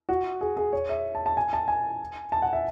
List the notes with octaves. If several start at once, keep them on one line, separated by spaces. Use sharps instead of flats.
F#4
G#4
G#4
C#5
E5
A5
A5
G#5
A5
G#5
A5
F#5
E5